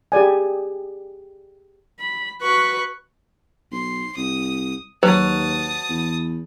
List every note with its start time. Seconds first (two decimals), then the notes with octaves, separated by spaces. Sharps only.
0.12 G4 G#4 D5 G#5
1.99 B5
2.42 F#4 B4 C#6 F#6
3.72 B1 C6
4.16 C2 D#6
5.03 D#2 F#3 B4 A5 D#6
5.89 E2